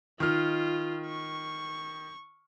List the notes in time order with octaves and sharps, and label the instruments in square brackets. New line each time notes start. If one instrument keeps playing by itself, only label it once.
[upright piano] D#3 F6 [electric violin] F4
[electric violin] C#6